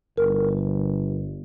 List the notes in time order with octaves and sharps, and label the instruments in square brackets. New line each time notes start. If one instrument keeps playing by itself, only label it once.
[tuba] G1 [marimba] A#4